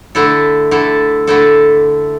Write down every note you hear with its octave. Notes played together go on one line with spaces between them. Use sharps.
D3 A3 E4 A4
D3 A3 E4 A4
D3 A3 E4 A4